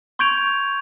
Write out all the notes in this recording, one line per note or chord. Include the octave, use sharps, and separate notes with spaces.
C6 C#6 G6 G#6 D7 F7